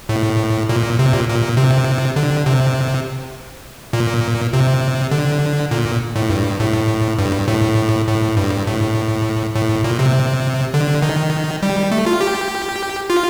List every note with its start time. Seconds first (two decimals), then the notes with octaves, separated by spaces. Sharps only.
0.09 A2
0.69 A#2
0.99 C3
1.13 A#2
1.28 A#2
1.57 C3
2.16 D3
2.46 C3
3.93 A#2
4.53 C3
5.11 D3
5.71 A#2
6.16 A2
6.30 G2
6.60 A2
7.18 G2
7.48 A2
8.08 A2
8.37 G2
8.67 A2
9.55 A2
9.84 A#2
9.99 C3
10.74 D3
11.02 D#3
11.63 G3
11.91 A3
12.06 F4
12.21 G4
13.10 F4